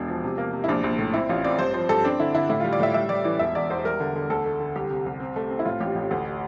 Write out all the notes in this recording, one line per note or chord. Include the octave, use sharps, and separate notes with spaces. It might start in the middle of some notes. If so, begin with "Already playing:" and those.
Already playing: E1 D4
F3
C3
A#3
C3
E4
A#1 D4
A#1
A2
C4 E4
A1 F4
C4 D5
G2 C5
F3 C5
G2 A4
C4 D4
D3 E4
D3 E4
A2 E4
F4
G3
D5
A2 E5
G3 E5
G3 D5
E3 D5
E1 E5
E2 D5
E2 C5
G3 A#4
D3
D3
D2 A4
A3
D3
C2 G4
C3
C2
C4
A3
C4
E4
A2 F4
A1 G4
A1
D2